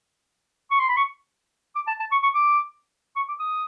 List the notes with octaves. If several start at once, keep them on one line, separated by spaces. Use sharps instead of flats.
C#6
C6
B5
C#6
D6
A5
A5
C#6
C#6
D6
C#6
D6
D#6